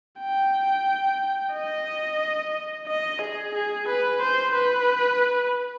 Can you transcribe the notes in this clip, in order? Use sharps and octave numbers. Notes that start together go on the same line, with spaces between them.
G5
D#5
D#5
G#4
G#4
B4
C5
B4